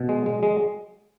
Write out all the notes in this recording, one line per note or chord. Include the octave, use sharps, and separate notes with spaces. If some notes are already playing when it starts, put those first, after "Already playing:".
Already playing: B2
G#3
G#3
G#3